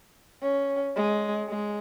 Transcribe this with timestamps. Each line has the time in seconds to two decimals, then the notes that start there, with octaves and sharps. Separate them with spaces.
0.42 C#4
0.96 G#3
1.49 G#3